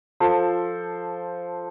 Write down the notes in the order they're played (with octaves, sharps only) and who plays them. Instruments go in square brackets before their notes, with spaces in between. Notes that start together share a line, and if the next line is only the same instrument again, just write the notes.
[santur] F3 A4 C5